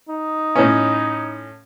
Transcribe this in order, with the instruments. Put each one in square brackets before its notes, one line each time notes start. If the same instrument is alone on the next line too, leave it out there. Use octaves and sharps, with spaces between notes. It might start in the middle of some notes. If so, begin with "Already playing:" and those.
[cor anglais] D#4
[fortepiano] A2 C#4